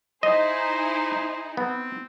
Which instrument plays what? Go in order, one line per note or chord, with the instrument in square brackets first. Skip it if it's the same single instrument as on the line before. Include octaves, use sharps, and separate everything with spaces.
[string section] D#4 E4 G#4 [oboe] C5 [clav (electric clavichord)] D#5
[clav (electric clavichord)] B3 [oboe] C4